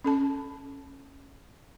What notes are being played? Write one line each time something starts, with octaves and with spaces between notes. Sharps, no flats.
C#4 A4 A5